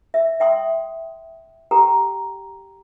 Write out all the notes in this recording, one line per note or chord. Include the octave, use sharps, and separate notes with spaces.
E5
E5 G5 C6 D#6
G4 A4 G5 A#5